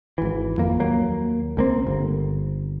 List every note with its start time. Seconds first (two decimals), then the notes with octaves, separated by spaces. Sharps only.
0.18 G#1 E3
0.58 F2 A#3
0.79 D#2 F#3 A#3
1.57 C#2 A#3 C4
1.87 G1